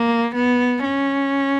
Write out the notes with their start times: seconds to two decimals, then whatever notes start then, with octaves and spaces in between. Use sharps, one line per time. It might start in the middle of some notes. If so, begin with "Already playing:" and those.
Already playing: A#3
0.35 B3
0.84 C#4